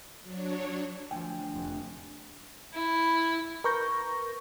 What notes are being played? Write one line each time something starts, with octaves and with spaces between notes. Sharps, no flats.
F#3 D4 C#5
D2 F3 G5 G#5
F1 F2
E4
A#4 B4 C#6 G6 A#6